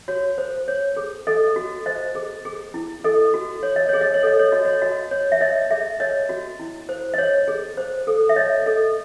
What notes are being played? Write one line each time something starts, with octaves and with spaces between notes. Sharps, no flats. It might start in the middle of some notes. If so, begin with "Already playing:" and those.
F#4 C#5
C5
C#5
G#4
A4 D#5
F#4
C5 D#5
G#4
G#4
E4
A4 D#5
F#4
C#5
D#5
G#4 C#5
D#5
C#5
A4 D#5
C#5
F#4 D#5
C#5
F#4 D#5
C#5
E5
C#5 D#5
G#4 E5
C#5 D#5
F#4
E4
C5
D#5
C#5
G#4
C5
A4
E5
C#5 D#5
A4 D#5